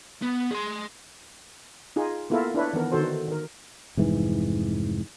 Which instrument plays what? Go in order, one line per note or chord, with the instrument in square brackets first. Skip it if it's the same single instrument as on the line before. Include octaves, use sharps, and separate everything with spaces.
[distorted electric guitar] B3
G#4 C6
[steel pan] D#4 F4 G#4
A#3 B3 E4 F4 A4 A#4
D4 E4 B4 C#5
D#3 E3 B3 A#4
D3 D#3 F#4 A4 C5
D#3 A#4
[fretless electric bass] F1 G#2 E3